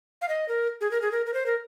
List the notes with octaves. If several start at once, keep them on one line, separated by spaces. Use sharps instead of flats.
F5
D#5
A#4
G#4
A#4
G#4
A#4
A#4
C5
A#4